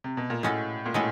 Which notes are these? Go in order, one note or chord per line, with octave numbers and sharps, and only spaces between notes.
C3
B2
A#2
A2 G#3 C#4 F#4 A4
A#2
A2 G#3 C#4 F#4 A4